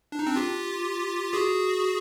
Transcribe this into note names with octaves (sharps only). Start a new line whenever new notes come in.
D4
D#4
C4 D4
F4 G4
F#4 G#4